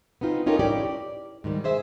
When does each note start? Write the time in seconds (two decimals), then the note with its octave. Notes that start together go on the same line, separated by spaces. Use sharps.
0.21 B3 C4 D#4 F4
0.46 C#4 D#4 F4 G4 A4 A#4
0.59 A2 C#4 D#4 G4 D5
0.89 D5
1.44 G#2 D#3 G3
1.64 G#4 C5 E5